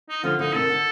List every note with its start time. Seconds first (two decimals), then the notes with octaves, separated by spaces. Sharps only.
0.09 D#4
0.23 D3 F3 F4
0.39 D3 F3 D#4
0.54 C3 D#3 A4
0.70 D3